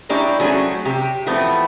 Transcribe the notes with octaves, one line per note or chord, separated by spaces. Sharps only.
G#3 A#3 D4 E4 G4 C#5
F#3 A3 C4 C#4 F#4 G#4
C3 G4
E3 F3 A3 B3 C4